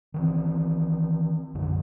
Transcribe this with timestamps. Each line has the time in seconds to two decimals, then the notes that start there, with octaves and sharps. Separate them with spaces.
0.14 D#3 E3 C4
1.54 B1 F#2 D3